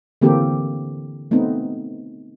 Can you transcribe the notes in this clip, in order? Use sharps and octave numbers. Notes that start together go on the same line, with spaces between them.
D3 E3 A#3 C4 G4 A4
A3 B3 C4 D#4